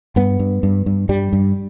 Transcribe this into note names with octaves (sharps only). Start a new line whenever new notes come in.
G2 B3
G2
G2
G2
G2 G3
G2